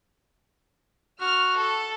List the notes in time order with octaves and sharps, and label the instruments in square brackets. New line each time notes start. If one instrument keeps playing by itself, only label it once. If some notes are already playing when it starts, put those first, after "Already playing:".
[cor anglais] F#4 [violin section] F6
[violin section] A4